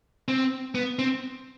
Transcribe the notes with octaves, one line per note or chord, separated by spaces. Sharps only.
C4
B3
C4